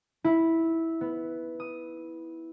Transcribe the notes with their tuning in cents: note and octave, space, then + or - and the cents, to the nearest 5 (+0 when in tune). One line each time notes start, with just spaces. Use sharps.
E4 -10
B3 +0
D#6 +5